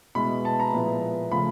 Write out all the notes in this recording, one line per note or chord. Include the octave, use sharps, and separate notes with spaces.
B2 G#3 B3 E4 B5
A5
A#5
A#2 F3 G#3 B3 E4
C#3 F3 A3 B5